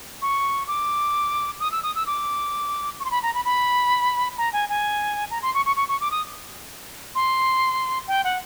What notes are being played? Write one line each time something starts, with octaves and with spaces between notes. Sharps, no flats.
C#6
D6
D#6
E6
D#6
E6
D6
C#6
C6
B5
A#5
B5
B5
A#5
G#5
G#5
A#5
C6
C#6
C#6
C#6
C#6
D6
D#6
C6
G5
F#5